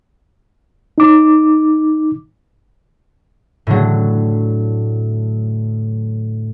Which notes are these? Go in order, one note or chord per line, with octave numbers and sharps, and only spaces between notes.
D#4 D6
A2 D3 F#3